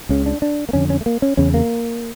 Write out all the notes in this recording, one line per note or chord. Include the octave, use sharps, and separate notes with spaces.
C#2 C#3 C#4
D4
D4
A#3
F2 D3 C#4
C#4
A3
A#3
C#4
E2 C#3 C#4
A#3